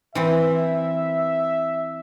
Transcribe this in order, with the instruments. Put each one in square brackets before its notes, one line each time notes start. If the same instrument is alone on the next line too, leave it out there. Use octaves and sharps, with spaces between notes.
[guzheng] E3 C4 [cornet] E5